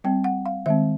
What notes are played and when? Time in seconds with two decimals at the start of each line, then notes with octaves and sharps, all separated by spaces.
0.04 G3 C4 G5
0.24 F#5
0.46 F5
0.66 D#3 G#3 C4 E5